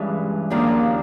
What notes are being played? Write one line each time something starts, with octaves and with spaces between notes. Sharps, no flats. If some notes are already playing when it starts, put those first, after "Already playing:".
Already playing: G2 E3 G#3 B3 C#4
D#2 C#3 F3 A#3 D4